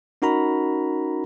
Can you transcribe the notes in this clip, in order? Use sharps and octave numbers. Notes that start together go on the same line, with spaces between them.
C#4 D#4 F#4 A#4 A#5 B5